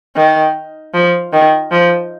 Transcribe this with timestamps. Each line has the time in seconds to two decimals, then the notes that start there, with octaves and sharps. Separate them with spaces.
0.16 D#3
0.94 F3
1.33 D#3
1.72 F3